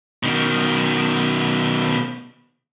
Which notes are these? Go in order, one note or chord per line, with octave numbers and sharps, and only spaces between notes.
B2 D#3